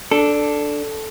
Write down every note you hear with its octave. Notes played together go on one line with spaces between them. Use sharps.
D4 A4